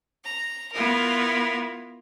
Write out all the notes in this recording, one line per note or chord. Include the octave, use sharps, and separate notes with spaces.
A#5
B3 E4 F4 A#4